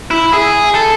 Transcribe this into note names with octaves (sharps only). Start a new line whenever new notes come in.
E4
G#4
A4